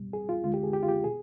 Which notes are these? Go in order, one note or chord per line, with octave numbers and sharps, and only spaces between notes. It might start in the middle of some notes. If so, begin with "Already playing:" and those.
Already playing: C2 B2 G3
G#4
F4
D2 D3 G#3 F4
G4
G#4
G4
F4
G4
B2 G#4